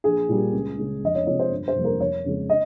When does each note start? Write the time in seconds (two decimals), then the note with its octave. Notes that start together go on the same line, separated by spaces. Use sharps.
0.04 A#1 G#4
0.29 A#2 G3 A#3
0.53 C#2
0.78 C#3 G#3
1.03 F1 D#5
1.15 C#5
1.27 F2 C3 F3 G#3 C#5
1.39 C5
1.51 G1
1.68 C5
1.76 F2 C3 G3 A#3
1.84 A#4
2.00 F1 C#5
2.25 F2 C#3 G#3
2.50 D#5